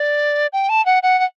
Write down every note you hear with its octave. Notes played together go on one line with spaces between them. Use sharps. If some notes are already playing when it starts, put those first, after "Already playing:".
Already playing: D5
G5
A5
F#5
F#5
F#5